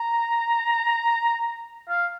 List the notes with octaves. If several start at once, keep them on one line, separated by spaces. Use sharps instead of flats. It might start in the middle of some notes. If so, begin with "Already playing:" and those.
Already playing: A#5
F5